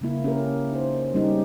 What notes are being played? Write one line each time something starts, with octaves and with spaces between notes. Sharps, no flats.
C#3 G#3 A#3 E4
C#4 G4 A#4
D#4 A#4 C5
G3 G#3 C#4 D#4 G4 A#4